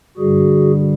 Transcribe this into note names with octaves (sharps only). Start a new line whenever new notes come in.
G2 D3 G3 F#4 G#4